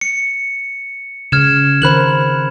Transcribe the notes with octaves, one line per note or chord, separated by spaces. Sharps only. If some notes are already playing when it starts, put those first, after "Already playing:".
C#7
C#3 F6 G#6 E7
D#3 A#4 C5 B5 F#6 F#7